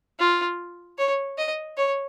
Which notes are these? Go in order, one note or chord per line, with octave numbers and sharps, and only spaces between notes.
F4
C#5
D#5
C#5